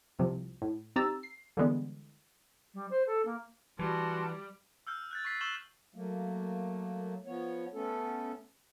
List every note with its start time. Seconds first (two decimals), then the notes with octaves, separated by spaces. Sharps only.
0.19 C2 C3 F3
0.62 A2
0.96 C4 D#4 G4 A#5 E6 A6
1.23 C7
1.57 D3 E3 G3 G#3 B3
2.74 G3
2.90 C5
3.06 A4
3.25 A#3
3.79 E3 G3 F#4 A5 C6
4.87 E6 F6 G6
5.11 F#6 G6 A6
5.25 C#6 A6 B6 C7
5.41 C#6 E6 G6 E7 F#7 G7
5.95 F#3 A3 A#3
7.26 F3 B3 C#5
7.73 A3 B3 C#4 A4